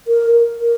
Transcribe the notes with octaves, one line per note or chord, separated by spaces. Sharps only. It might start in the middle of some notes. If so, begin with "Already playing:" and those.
A#4
A#4